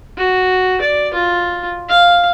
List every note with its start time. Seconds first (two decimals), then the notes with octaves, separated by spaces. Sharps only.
0.17 F#4
0.81 D5
1.14 F4
1.89 F5